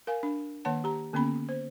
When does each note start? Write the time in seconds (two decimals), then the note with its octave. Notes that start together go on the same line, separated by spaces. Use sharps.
0.07 A#4 F5 G#5
0.23 D4
0.65 D#3 A#3 C#5 F#5 A5
0.84 G4 A#5
1.13 D3 A#3 B3 C#4 B5
1.49 C5